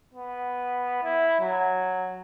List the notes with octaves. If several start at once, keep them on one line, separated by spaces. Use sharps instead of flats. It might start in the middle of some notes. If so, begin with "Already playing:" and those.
B3
E4
F#3